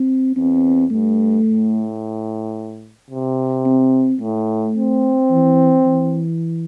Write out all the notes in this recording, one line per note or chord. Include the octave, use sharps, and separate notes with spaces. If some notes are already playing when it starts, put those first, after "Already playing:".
Already playing: C4
E2 C4
G2 A3
A2
C3
C4
A2 A3
C4
E3
E3